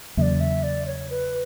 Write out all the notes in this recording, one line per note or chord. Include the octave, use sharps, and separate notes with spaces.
E2 C#3 F#3 A#3 D5 E5
E5
D5
C#5
B4